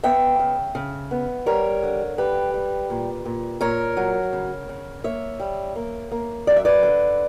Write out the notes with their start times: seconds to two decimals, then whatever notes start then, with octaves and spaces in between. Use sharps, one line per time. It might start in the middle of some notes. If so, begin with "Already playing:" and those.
0.04 B3 E5 G5
0.39 C#3
0.75 C#3
1.11 B3
1.46 G3 A#4 C#5
1.83 D3
2.18 G3 G4 B4
2.54 G3
2.90 A#2
3.25 A#2
3.61 A#2 A#4 C#5
3.97 F#3
4.33 C#3
4.69 C#3
5.04 A#3 C#5 E5
5.40 G3
5.76 A#3
6.11 A#3
6.47 F#2 D5
6.56 E5
6.65 B4 D5
6.83 D3